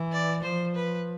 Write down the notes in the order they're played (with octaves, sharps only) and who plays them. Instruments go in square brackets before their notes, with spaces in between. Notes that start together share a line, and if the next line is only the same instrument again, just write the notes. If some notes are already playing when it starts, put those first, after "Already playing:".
Already playing: [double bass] E3
[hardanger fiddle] D5
[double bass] F3 [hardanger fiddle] C5
[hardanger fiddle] B4